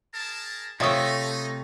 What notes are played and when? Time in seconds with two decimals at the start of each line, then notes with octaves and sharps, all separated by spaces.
0.14 G#4 A#4 A5
0.80 C3 A3 D#4 F4 C#5 C#6 D#6 A6